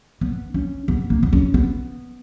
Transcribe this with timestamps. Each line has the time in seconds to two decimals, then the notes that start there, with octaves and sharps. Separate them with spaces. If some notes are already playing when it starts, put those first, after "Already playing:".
0.21 B3
0.54 C#4
0.88 B3
1.10 A#3
1.23 B3
1.33 C#4
1.54 B3